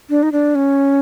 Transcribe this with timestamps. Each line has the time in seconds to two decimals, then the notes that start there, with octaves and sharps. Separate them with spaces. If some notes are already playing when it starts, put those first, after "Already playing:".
0.10 D4
0.23 D#4
0.32 D4
0.55 C#4